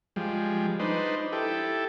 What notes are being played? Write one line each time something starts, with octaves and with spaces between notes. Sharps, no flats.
F3 G3 G#3
D4 D#4 B4 C5
E4 G4 A4